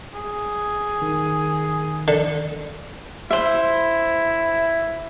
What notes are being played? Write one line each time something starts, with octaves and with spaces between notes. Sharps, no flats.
G#4
D#3
D3
E4 C5 E5